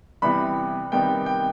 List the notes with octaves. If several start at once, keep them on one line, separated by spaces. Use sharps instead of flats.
C3 E3 G3 B3 B5
C3 D#3 G3 B3 G5
G5